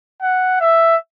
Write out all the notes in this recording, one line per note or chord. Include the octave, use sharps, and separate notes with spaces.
F#5
E5